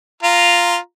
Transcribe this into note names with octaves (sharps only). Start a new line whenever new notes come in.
F4 A#5